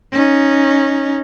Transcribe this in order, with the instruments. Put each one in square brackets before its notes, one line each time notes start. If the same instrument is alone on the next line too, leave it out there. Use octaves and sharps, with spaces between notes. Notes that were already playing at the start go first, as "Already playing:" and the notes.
[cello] C#4 D#4